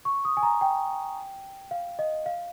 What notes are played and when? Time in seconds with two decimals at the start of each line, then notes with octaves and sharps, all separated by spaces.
0.05 C#6
0.25 D#6
0.37 G#5
0.43 A#5
0.61 G5
1.71 F5
1.99 D#5
2.26 F5